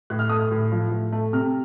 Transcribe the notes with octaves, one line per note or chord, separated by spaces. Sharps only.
A2 F#6
F6
A3 D#6
F6
A2
F3
A2
A3
C3 F6